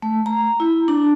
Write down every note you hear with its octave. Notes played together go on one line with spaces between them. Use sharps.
A3
A#5
E4
D4